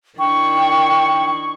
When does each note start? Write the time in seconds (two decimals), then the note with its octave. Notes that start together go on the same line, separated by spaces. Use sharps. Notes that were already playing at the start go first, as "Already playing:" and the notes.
0.19 D#3 D4 E4 G5 C#6